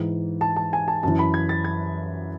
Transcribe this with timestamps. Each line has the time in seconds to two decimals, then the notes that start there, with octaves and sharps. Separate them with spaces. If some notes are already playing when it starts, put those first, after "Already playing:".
Already playing: G#2 E3
0.41 A5
0.56 A5
0.73 G#5
0.88 A5
1.03 F#2 E3 A5
1.19 B5
1.34 G#6
1.49 A6
1.64 G#6